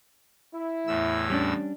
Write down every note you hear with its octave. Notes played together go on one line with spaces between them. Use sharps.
E4
E2 A2 E6
G3 C#4 D4